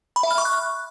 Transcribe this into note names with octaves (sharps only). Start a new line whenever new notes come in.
B5
E5
F6
C#6
F#6